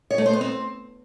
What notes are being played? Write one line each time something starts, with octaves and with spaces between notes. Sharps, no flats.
C#5
A3
C5
B3
C4